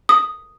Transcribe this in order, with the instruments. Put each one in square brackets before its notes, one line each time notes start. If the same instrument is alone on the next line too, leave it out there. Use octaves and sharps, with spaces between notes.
[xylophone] D#6